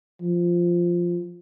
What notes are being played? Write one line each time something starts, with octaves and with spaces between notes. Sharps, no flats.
F3